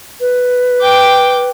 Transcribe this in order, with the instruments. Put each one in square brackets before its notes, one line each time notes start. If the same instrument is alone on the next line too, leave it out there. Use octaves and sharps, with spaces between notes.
[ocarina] B4
[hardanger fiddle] G5 D6